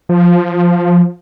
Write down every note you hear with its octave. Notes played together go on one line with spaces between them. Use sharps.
F3